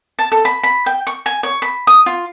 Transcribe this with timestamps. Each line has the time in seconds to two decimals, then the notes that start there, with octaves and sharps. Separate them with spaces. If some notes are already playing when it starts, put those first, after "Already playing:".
0.19 A5
0.32 A4
0.45 B5
0.63 B5
0.86 G5
1.07 C#6
1.26 G#5
1.43 C#5
1.62 B5
1.87 D#6
2.06 F4